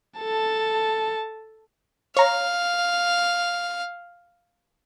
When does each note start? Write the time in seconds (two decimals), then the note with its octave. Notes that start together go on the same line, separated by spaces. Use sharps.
0.19 A4 A5
2.17 C#5 F5 A#5